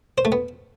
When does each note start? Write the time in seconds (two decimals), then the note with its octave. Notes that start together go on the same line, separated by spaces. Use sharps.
0.18 C5
0.25 A3
0.32 B3